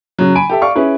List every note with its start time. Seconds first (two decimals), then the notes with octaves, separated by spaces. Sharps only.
0.19 C#3 F#3
0.35 G#5 B5 D7
0.50 G4 A4 E5
0.62 D5 F5 C#6
0.75 C#4 E4 G#4 B4